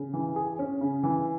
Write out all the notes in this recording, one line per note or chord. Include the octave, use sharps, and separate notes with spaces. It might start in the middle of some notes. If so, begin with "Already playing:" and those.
Already playing: C#3
E3
G#4
C#4
C#3
E3